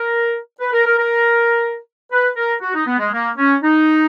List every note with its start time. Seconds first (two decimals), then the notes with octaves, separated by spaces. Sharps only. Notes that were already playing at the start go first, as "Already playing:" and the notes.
Already playing: A#4
0.60 B4
0.72 A#4
0.85 A#4
0.98 A#4
2.11 B4
2.36 A#4
2.61 F#4
2.75 D#4
2.87 B3
2.99 G#3
3.12 A#3
3.37 C#4
3.62 D#4